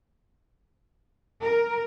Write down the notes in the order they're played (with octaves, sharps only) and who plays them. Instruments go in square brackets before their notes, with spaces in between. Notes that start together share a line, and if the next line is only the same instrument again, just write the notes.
[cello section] A#4